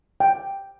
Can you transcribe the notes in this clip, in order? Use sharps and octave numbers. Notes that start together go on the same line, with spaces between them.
G5